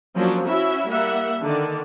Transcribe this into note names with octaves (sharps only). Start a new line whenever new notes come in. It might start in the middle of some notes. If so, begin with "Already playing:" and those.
F3 F#3 A#3 C#4 D4
C#4 E4 F#4 E5
G3 A#3 E5 F#5
D3 D#3 D5